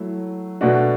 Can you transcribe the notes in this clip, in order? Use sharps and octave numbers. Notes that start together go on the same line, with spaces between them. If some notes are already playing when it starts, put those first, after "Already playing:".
Already playing: F#3 A3 E4
B2 A3 D4 F#4